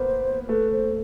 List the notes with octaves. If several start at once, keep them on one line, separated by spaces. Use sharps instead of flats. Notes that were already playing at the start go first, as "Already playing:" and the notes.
Already playing: A#3 B3 C5
A3 B4
C5